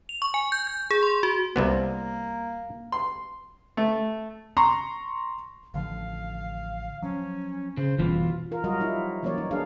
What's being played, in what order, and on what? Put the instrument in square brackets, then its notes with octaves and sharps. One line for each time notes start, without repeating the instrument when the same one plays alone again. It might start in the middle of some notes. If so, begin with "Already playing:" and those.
[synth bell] F7
C#6
G#5
G6
G6
G#4
C6
F#4
[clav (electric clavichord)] C2 C3 B3 [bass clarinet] A#3
[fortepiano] C6
A3
[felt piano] A#5 C6 C#6
[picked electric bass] A1 D3 F3 [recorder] F5
[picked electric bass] F3 F#3 [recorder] C#4
[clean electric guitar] C#3 [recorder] C5
[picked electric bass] F#1 D3 G3 [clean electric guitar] E2 B2 E3 [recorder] F4
[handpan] F4 A#4
F#3 G3 F#4 A#4 D#5
F3 D#4 E4
E3 F#3 A#3 C#4 C#5 D5
D#4
A#3 D4 D#4 G#4 A#4 F5